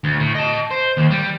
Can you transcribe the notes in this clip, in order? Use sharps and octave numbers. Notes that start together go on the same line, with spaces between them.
D2
A2
D#5 A5
C5
D#2
G3